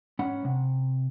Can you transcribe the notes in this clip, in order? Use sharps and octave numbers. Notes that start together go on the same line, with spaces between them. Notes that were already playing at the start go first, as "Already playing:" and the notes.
G#2 C#4 F#5 B5
C3